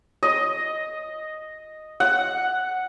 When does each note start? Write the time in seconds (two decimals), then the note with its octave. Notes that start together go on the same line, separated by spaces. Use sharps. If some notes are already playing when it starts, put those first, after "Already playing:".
0.23 D#5
2.00 F#5